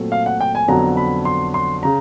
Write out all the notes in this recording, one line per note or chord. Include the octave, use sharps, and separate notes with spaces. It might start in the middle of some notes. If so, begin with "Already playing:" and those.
Already playing: A#2 F#3 A3 C4
F5
F#5
G5
G#5
F2 D3 F#3 B3 A#5
B5
C6
C6
C#3 A#5